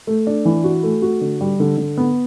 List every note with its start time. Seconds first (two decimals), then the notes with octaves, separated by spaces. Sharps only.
0.07 A3
0.27 D4
0.45 E3
0.64 F#4
0.83 A3
1.02 F#4
1.21 D3
1.41 G3
1.60 D3
1.78 D3
1.97 B3